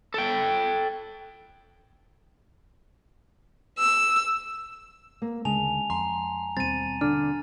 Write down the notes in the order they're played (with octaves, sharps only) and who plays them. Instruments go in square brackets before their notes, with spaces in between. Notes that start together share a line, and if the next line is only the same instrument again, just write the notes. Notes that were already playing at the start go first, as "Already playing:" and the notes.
[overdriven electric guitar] A4 G5
[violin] E6
[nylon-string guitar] A#3
[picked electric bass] D2 C#3 [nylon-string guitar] G#3 [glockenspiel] G#5 A5 F7
[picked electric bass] F2 [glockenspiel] A#5 [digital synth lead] C6
[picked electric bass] D#2 B2 G3 [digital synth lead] C4 [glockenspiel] A6 D#7
[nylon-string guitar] D3 [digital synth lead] D4 [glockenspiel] F6